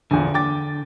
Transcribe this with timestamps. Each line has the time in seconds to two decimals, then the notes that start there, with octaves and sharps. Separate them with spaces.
0.11 A#1 E2 D3
0.34 G5 D6 A6